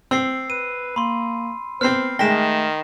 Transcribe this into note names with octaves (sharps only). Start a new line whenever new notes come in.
C4 E6 C7
B4 D#7
A#3 B5 C6
B3 C4 C5 F6 C7
D#3 G#3 A3 G5 A#6 B6 E7